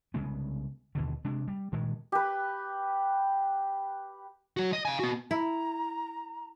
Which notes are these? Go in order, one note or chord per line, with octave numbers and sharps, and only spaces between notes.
C2 C#3 G#3 B3
D#2 B2 D3
C3 G#3 D4
G3
G2 A#2 D#3 G#3
G4 B4
F#3 F#4
D#5
F5 G#5
B3 F#4
E4 A#5